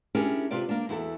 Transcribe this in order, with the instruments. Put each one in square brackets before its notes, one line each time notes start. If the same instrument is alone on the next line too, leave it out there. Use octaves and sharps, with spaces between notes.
[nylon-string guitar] C#4 D4 E4 G4 G#4 A#4
C3 F4 G4 B4 D5
A#3 D4
E2 E4 F#4 A4